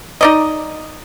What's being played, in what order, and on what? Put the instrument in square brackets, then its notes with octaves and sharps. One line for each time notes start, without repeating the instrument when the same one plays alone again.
[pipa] D#4 D5 D#5